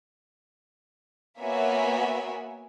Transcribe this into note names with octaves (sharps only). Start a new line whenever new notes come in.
A#3 B3 F#4 C#5 E5 G#5